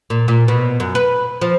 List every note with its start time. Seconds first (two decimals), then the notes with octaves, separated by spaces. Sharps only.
0.10 A#2
0.28 A#2
0.48 B2
0.80 F#2
0.95 B4
1.41 F3